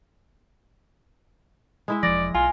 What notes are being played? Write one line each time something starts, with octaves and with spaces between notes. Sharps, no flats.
G#3 E4 E5
E1 F3 D5 A#6
B1 F4 G#5